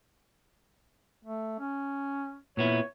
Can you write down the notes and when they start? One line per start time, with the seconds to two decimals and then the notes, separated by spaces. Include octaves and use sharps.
1.25 A3
1.60 C#4
2.57 A#2 B3 E4 C#5